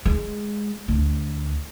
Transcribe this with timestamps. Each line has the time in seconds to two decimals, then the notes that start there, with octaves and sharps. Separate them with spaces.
0.05 G#3
0.88 D2